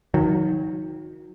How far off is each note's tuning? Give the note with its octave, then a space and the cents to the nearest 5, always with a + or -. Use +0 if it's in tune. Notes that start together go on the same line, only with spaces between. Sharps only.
D#3 +15 F#3 -25